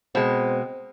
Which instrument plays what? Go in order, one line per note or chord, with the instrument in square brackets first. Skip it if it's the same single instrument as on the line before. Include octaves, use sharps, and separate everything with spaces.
[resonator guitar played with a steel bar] B2 G#3 [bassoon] C4